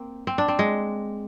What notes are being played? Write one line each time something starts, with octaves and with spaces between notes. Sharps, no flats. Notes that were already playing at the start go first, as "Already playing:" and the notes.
Already playing: A#3 C4
C4
D4
C4
G#3